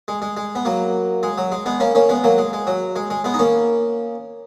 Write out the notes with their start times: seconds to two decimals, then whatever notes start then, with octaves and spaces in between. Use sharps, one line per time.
0.08 G#3
0.22 G#3
0.37 G#3
0.55 B3
0.65 F#3 A#3
1.23 G#3
1.38 F#3
1.52 G#3
1.66 G#3 B3
1.80 A#3 C#4
1.95 A#3 C#4
2.09 G#3 B3
2.24 F#3 A#3
2.38 G#3
2.53 G#3
2.67 F#3
2.96 G#3
3.10 G#3
3.24 G#3 B3
3.34 D#4
3.39 A#3 C#4